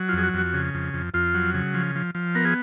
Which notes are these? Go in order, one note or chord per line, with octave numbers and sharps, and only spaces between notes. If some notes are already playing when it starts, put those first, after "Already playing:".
Already playing: F#3
F4
F2 G#4
F#4
F2 F#4
C#3
F2
F2
F2 F4
F#3
C#3
F3
F3
F3
B3 A#4
G#4